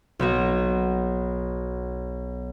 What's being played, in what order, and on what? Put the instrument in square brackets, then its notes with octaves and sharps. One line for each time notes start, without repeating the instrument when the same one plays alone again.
[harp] B1 B3 F#4